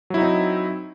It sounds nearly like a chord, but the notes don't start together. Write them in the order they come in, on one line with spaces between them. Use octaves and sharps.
F#3 E4 D#4 C4